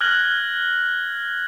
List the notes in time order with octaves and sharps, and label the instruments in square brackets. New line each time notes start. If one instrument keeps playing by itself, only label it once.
[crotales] F6 F#6 G#6 A#6 F#7